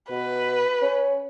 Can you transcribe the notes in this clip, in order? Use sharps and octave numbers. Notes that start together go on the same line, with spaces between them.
B2 B4
C#4